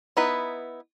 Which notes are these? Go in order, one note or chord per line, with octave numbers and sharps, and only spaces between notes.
B3 D#4 E4 B4